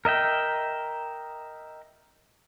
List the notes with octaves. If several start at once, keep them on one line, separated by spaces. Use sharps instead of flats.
A#4 D#5 E5 G5